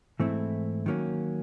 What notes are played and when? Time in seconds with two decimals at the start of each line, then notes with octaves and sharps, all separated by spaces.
0.20 G#2 E3 A3 C4 E4
0.86 D#3 F#3 A#3 C#4